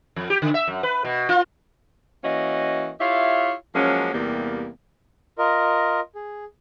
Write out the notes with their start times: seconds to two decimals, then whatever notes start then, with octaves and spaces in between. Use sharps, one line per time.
0.16 F2
0.30 G4
0.42 D3
0.54 E5
0.68 F#2
0.83 B4
1.05 B2
1.29 F4
2.24 E3 A#3 C#4 F#4 D#5
3.00 E4 F4 G4 C#5 E5 F5
3.75 F3 F#3 G#3 A#3 C#4
4.14 E2 C3 G3 A#3
5.38 F4 A#4 D#5
6.15 G#4